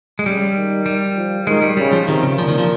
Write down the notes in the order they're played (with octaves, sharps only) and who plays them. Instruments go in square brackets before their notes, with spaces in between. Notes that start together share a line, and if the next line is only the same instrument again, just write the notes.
[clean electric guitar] G#3
[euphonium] C#3 [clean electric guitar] G3
[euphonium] D#3
[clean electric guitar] G3
[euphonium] F3
[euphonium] D#3 [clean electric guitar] G#3
[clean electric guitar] G3
[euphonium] C#3 [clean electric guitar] G3
[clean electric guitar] F3
[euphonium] C3 [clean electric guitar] D#3
[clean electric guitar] C#3
[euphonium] A#2 [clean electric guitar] F3
[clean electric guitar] D#3
F3